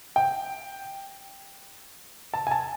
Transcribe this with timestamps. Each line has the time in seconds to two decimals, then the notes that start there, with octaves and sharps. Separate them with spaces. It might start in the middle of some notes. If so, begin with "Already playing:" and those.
0.16 G5
2.34 A5
2.47 G#5
2.51 A5